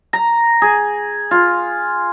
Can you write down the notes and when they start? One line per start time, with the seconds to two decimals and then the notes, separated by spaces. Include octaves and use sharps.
0.13 A#5
0.62 G#4
1.31 F4